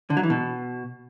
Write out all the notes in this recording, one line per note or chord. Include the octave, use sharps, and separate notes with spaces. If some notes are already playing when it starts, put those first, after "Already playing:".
D3
F#3
E3
B2